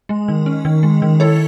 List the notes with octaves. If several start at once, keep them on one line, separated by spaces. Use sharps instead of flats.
G#3
D#3
C#4
D#3
G#3
D#3
E4 A4 C#5